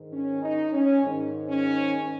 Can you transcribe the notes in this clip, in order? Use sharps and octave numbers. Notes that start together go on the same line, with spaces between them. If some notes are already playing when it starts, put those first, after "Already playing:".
Already playing: G#2 D#3
C#4
D#4
C#4
G#2 D#3
C#4